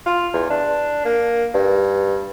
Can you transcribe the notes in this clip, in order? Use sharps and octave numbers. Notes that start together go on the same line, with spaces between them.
F4
E2
D4
A#3
G2